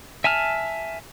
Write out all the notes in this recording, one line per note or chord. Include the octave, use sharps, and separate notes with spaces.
E5 G#5 A5 F6